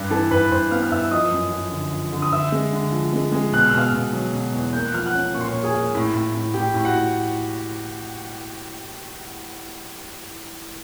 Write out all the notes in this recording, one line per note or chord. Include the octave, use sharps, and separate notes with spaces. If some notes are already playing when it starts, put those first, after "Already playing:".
Already playing: G2
E3 A4 A5
G2 B4 B5
G2 C5 C6
B3 F5 F6
F6
G2 E5 E6
E6
F3 D#5 D#6
F#2
F3
D3
F3
D3
D#6
D3 E5 E6
G#3
D3
F3
G#3
G#3
B2 F#6
F6
E6
B2 F5 F6
B2
F#3
B2
E2
A#3 G6
F#6
F3 F6
F#5 F#6
C#4
A#2 C#6
C6
C#5 C#6
A#3
G#4 G#5
A#3
A2
A2
A2
A2 G4 G5
A2
F#4 F#5
A2